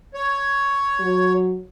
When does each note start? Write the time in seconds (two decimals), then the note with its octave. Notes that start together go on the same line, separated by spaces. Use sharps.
0.14 C#5
1.00 F#3